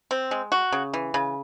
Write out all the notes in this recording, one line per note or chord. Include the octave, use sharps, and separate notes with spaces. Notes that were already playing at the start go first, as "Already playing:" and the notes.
C4
G#3
F#4
C#3
E3
C#3